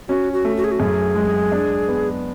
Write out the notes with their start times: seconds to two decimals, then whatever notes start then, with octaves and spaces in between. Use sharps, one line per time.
0.08 C#4 F#4
0.33 F#4
0.45 A3
0.56 F#4
0.64 G#4
0.71 F#4
0.80 F#2 G#4
1.15 G#3
1.52 D4
1.88 B3